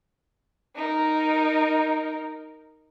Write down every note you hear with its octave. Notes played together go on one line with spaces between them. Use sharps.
D#4 A#4